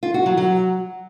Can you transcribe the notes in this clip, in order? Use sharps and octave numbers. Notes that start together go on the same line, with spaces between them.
F4
F#4
F#3
F#3